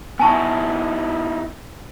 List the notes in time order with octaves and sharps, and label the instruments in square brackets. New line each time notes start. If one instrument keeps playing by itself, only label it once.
[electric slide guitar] B3 D#4 E4 [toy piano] G#5 A5 C#6